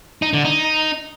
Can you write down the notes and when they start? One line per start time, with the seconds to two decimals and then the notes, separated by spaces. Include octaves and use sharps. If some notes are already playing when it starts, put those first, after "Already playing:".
0.22 D#4
0.33 D3
0.45 D#4